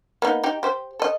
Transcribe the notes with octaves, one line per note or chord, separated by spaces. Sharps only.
A#3 B3 D#4
D#4 G4
G4 C5
A4 D#5